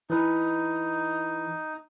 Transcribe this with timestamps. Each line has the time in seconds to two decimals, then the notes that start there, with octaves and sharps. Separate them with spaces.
0.10 E3 D#4 B4